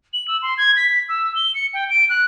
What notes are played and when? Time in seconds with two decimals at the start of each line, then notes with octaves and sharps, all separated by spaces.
0.13 F#7
0.28 E6
0.42 C6
0.58 G#6
0.77 B6
1.09 E6
1.36 G7
1.55 C#7
1.74 G5
1.90 D7
2.09 F#6